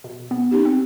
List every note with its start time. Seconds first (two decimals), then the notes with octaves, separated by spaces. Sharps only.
0.04 B2
0.31 B3
0.51 C#4 D#4 G4
0.65 C4